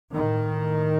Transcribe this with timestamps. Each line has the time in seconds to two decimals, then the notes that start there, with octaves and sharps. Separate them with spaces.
0.13 A2 D#3